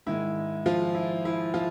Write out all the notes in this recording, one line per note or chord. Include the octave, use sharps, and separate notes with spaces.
G#2 D#3 G#3 E4
F3 F4
E4
E4
F3 F4